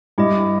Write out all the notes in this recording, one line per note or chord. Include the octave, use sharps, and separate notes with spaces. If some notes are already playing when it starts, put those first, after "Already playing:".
G2 E4 G4 D#5